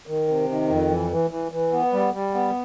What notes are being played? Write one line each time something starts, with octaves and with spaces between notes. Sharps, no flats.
D#3
C3
D#3
F2
E3
E3
E3
E3
B3
G3
G3
B3